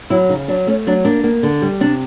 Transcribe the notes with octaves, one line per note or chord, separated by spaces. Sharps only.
F#3 E4
C#3 D#4
F#3 D4
A3 C#4
F#3 D4
A#3 D4
A#3
D3
G3
C3 D4